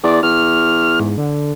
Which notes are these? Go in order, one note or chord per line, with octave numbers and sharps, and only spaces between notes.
E2 D5
E2 F6
G#2
D3